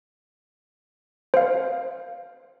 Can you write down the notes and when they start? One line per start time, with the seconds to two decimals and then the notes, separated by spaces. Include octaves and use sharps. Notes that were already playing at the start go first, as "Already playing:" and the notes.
1.34 C5 F5